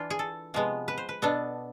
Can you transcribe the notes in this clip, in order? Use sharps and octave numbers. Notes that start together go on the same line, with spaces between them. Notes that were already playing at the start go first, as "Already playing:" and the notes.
Already playing: E3 D4 F4
G#4
A4
C3 F3 G#3 B3
B4
C5
B4
B2 B3 D4 A4